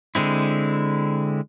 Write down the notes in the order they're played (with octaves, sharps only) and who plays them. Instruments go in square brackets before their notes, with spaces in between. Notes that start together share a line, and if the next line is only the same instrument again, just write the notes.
[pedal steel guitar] D3 G#3 C4 E4